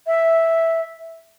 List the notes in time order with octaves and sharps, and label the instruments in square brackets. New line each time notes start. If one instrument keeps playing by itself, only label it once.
[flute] E5